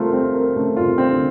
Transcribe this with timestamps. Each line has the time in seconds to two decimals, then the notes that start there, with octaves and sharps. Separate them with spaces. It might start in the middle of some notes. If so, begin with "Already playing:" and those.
Already playing: C3 A3 C4 F4 A#4
0.13 C4
0.34 A#4
0.56 C#3 A3
0.77 C#3 F4
0.87 C3
0.98 C4
1.12 D3